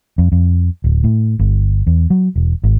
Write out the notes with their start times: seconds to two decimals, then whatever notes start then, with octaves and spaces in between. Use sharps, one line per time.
0.18 F2
0.32 F2
0.84 D1
1.04 A2
1.39 G1
1.87 E2
2.10 F#3
2.36 E1
2.64 G#1